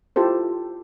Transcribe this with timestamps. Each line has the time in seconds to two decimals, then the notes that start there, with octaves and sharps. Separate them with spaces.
0.16 E4 F4 G4 A4 C5